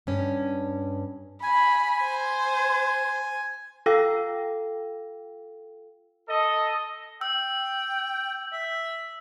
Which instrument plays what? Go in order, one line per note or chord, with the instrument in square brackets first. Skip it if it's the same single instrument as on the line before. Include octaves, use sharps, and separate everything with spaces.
[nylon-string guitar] G2 C#4
[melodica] G#5 [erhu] B5
[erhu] C5
[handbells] F4 A4 F5 G5 E6 A#6
[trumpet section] A4 D#5
[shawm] G5 [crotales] E6
[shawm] E5